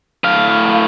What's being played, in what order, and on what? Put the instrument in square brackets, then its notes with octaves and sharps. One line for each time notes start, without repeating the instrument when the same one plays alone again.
[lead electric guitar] A2 F5